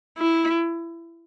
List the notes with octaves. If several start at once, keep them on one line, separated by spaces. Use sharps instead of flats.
E4